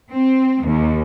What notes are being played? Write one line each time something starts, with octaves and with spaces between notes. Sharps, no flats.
C4
D#2